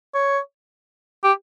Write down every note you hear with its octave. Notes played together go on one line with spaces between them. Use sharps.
C#5
G4